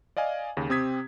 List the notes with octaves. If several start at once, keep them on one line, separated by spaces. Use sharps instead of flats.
D5 D#5 F5 G#5
D#2 C#3
C3 C4 G4 D#6 G#6 B6